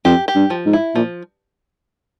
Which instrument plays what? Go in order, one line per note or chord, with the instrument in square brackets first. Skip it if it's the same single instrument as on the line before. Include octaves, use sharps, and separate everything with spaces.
[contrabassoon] F2 [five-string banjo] G4
[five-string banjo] G4
[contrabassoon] G2
[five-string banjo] F3
[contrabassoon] G#2
[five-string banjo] E4
[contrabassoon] A#2 [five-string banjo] F3